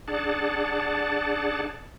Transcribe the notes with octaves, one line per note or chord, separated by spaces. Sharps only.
D4 G#4 D5 F#5 A5